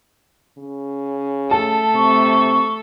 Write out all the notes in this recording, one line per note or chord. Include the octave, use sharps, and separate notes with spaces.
C#3
A3 A4 A5
C3 C#6